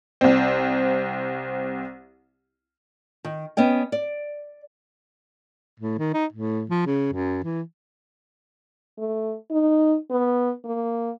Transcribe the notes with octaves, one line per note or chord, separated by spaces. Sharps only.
C2 C4
D#3
B3 C#4 D#5 G5
D5
A2
D#3
D#4
A2
F3
C#3
F#2
E3
A3
D#4
B3
A#3